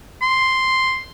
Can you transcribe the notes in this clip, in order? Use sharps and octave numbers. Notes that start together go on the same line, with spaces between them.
C6